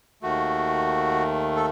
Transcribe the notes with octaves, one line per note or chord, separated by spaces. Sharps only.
D#2 D#3 A3 F#4
A4